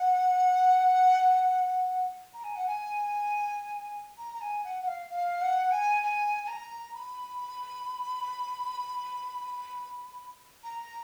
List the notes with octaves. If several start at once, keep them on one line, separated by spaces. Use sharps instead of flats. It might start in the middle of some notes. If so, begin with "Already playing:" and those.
Already playing: F#5
A#5
G#5
F#5
G#5
A#5
A#5
G#5
F#5
F#5
F5
F5
F#5
G#5
G#5
G#5
A#5
B5
A#5